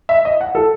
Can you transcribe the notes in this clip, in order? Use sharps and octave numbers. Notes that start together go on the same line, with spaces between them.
E5
D#5
F#5
A4